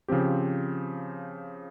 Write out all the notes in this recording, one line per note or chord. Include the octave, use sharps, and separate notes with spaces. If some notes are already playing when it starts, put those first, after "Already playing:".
C#3 F3 C4 G4